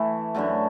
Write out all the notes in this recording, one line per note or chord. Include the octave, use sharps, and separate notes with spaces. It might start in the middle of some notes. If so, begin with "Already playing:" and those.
Already playing: E3 A3 E4
F#2 D3 F#3 A3